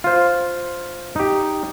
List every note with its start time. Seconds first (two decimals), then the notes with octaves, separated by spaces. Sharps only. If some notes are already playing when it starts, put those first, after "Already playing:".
0.04 F4 C5
1.16 D#4 G4